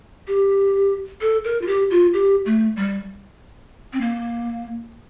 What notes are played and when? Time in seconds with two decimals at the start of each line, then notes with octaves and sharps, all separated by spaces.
0.28 G4
1.21 A4
1.44 A#4
1.62 F4
1.67 G4
1.91 F4
2.14 G4
2.46 A3
2.76 G3
3.93 C4
4.01 A#3